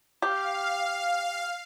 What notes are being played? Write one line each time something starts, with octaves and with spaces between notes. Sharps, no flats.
G4 F5